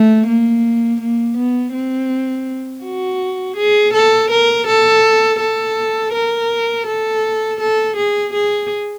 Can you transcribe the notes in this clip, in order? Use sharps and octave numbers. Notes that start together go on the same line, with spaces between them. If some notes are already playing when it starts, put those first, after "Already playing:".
Already playing: A3
A#3
A#3
B3
C4
F#4
G#4
A4
A#4
A4
A4
A#4
A4
A4
G#4
G#4